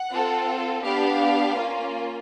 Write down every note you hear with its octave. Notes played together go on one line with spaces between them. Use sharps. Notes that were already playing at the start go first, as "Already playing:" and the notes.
Already playing: F#5
C4 F4 A4
B3 D4 G4 F5
A#3 C#4 F4